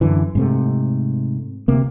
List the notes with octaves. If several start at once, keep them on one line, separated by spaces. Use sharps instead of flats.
F#2 D3 E3
G#2 C3 A3
D2 C3 A#3